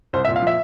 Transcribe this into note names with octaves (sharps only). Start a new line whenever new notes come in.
C2 C5
E5
A#2
F5
F3 E5